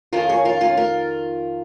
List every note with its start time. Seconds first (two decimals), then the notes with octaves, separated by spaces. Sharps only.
0.13 F2 D#3 C#4 F4 A#4
0.29 G#4 C#5
0.45 F4 A#4
0.61 C#4 F4
0.77 F4 A#4